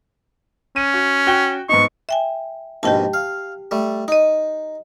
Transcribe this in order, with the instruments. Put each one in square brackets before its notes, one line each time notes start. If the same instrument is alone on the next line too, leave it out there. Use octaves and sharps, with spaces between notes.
[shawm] C#4 [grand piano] D#7
[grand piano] F#4
F#4 G5 G7
[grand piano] G#2 B3 D#4 [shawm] C#6
[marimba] E5 G5 G#5
[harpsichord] A#1 G#2 B2 [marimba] G4 G5 A5
[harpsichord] F5
G3 A3
[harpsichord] D#4 [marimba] D#5 D#6